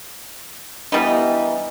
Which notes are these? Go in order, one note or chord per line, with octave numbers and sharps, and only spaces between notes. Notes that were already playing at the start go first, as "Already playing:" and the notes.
E3 G3 B3 D#4